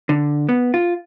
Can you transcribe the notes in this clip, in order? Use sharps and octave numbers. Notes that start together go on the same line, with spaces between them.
D3
B3
F4